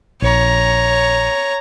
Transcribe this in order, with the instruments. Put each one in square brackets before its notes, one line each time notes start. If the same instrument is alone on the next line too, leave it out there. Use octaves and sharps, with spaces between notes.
[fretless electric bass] A#1 [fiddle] C#5 A#5